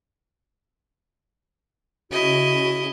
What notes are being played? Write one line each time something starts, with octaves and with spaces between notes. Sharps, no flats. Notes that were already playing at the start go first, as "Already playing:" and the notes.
C#3 E4 F#4 D#5